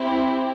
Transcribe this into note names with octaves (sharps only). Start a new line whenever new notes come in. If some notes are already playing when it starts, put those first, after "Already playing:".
Already playing: C4 E4 G4